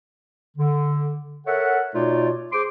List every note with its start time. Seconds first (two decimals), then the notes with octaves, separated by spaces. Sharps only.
0.57 D3
1.46 A4 A#4 C#5 E5 F#5
1.94 B2 A3 D#4 F4 C#5 D5
2.52 G#4 C5 C6 D6